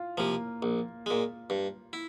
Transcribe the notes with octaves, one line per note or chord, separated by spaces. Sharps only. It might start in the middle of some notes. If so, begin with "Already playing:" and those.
Already playing: F4
C3 F3 A#3
A#1
A#2 G#3
G2
E4